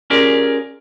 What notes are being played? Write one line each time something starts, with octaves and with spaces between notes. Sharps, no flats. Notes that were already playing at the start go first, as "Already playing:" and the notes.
C#4 F4 G4 G#4 A#4 D5